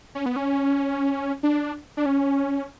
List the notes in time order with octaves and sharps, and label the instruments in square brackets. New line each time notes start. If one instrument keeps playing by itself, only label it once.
[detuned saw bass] C#4
B3
C#4
D4
D4
C#4